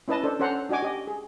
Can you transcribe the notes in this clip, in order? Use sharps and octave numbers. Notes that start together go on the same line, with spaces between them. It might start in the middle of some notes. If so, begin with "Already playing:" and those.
C#4 E4 B4 D#5 A5
D4 A4 C5
C#4 A4 C5 F#5 A#5 C6
D4 F#4 D#5 G#5 D6
G4 D#5
G#4